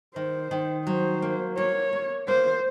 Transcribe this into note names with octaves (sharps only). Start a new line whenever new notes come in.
D#3 C5
D#3
F#3 C5
A#3
A#3 C#5
A#3
A#3 C5